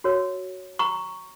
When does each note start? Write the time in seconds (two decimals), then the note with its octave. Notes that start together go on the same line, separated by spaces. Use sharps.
0.04 F#4 A#4 C#5
0.79 A#5 C#6